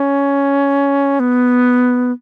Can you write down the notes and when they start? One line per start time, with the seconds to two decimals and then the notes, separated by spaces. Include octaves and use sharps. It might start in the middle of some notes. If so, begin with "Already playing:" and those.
Already playing: C#4
1.20 B3